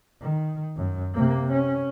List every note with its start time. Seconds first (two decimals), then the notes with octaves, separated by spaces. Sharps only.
0.21 D#3
0.76 F#2
1.14 C3 A#3
1.52 C#4